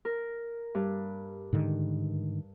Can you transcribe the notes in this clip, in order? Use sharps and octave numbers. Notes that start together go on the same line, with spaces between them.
A#4
G2
G#2 D3 D#3